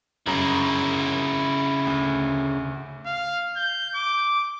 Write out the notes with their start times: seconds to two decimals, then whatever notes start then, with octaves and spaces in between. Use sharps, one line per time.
0.26 G1 F#2 C#3 E4 A#5
1.87 D2
3.06 F5
3.56 G6
3.95 D6